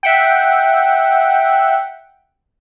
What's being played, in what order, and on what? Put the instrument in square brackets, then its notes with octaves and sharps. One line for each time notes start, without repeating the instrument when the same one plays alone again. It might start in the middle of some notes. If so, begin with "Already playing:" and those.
[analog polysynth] E5 F#5 G5